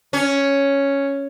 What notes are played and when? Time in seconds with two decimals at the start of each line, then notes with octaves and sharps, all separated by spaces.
0.13 C#4